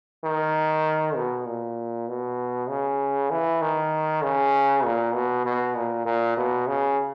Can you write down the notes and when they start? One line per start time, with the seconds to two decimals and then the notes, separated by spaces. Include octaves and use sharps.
0.24 D#3
1.16 B2
1.47 A#2
2.08 B2
2.69 C#3
3.31 E3
3.62 D#3
4.22 C#3
4.84 A#2
5.14 B2
5.45 B2
5.76 A#2
6.05 A#2
6.37 B2
6.67 C#3